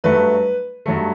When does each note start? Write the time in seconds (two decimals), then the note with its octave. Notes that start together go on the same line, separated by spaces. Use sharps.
0.04 G2 F#3 A3 B4
0.86 G2 F#3 A3